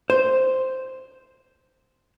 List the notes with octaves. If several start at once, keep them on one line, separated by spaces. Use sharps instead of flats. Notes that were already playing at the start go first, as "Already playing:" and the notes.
C5